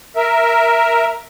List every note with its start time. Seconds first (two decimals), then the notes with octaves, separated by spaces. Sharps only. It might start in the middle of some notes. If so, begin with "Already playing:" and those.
0.16 A#4 E5